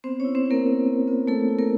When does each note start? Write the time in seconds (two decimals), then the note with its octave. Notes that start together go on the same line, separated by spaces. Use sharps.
0.04 B3 C4 C5
0.20 C#4 C#5
0.25 E4
0.35 C4 C5
0.45 E4
0.51 A#3 A#4
0.67 B3
0.87 B3
1.07 B3
1.27 A3 E4 A4
1.48 E4
1.58 A#3 A#4